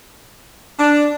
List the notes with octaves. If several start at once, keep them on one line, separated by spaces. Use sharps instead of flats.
D4